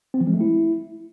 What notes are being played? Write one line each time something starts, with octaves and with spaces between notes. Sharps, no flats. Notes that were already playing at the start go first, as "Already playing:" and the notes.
C4
F3
G#3
A3
E4